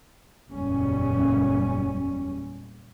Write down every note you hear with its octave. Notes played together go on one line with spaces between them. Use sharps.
F#1 E2 A#2 G3 C#4